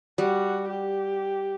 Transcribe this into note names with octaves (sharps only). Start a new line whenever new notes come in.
G3 F#4
G4